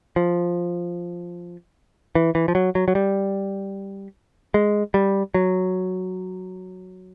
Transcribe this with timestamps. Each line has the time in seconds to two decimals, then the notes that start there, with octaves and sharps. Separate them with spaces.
0.16 F3
2.15 E3
2.35 E3
2.48 F3
2.55 F#3
2.75 F#3
2.88 F#3
2.95 G3
4.54 G#3
4.94 G3
5.34 F#3